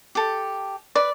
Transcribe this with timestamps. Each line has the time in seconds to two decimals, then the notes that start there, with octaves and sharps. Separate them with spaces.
0.15 G4 A4
0.95 B4 D5